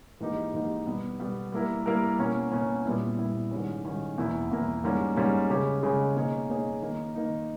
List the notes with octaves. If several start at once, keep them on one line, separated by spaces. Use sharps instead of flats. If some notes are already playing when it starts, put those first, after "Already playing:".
G#2 E3 A#3 D#4 G4
G#2 E3 A#3 D#4 G4
B2 G3 B3
B2 G3 B3
G3 A#3 E4 A#4
G3 A#3 E4 A#4
B2 A#3 C#4
B2 A#3 C#4
A#2 G3 B3 E4
A#2 G3 B3 E4
G#2 D#3 G3 C#4
G#2 D#3 G3 C#4
E2 B2 A#3 E4
E2 B2 A#3 E4
G#2 G3 A#3 C#4
G#2 G3 A#3 C#4
C#3 G#3 C#4 G4
C#3 G#3 C#4 G4
B2 A#3 D#4 G#4 C#5
B2 A#3 D#4 G#4 C#5
D#3 A#3 D#4
D#3 A#3 D#4